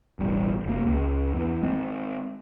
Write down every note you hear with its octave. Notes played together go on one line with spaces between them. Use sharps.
E1 A1 G3
F1 A#3
C#2
E2
G#3 C4